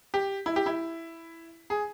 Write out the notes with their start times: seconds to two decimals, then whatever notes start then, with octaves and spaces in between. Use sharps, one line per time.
0.14 G4
0.46 E4
0.56 G4
0.66 E4
1.70 G#4